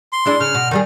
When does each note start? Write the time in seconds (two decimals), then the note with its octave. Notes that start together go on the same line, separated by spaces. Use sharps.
0.13 C6
0.26 G#3 D4 E4
0.40 C#3 F6
0.54 B2
0.71 D#3 G3 G#4